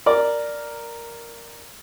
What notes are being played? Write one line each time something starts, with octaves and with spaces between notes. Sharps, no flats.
A#4 D5